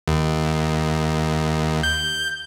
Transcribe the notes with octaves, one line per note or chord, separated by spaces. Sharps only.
D#2
G6